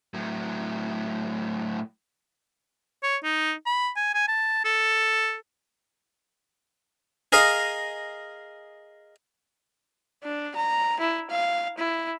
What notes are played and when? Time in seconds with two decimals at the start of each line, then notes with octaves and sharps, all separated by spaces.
0.14 A2 F#3
3.03 C#5
3.23 D#4
3.66 B5
3.96 G#5
4.14 G#5
4.28 A5
4.65 A4
7.32 G#4 A#4 D#5 F5
10.24 D4
10.55 A#5
11.00 E4
11.31 F5
11.78 E4